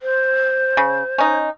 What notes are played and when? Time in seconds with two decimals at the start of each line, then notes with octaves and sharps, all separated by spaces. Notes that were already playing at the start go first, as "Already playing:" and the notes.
0.02 C5
0.77 C#3
1.18 C#4 D#4